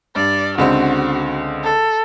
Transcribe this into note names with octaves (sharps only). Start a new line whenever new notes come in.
G2 D5
C#2 D3 C4 F#4
A4